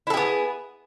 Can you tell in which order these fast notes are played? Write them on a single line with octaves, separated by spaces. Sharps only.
E4 A4 G#4 B3